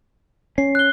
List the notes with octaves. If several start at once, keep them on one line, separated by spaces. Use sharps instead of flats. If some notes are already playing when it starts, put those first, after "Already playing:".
C#4 C7
F#6 G7